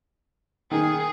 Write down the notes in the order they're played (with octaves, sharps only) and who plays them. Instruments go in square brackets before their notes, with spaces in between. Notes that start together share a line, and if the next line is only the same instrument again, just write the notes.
[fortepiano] D#3 [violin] G#4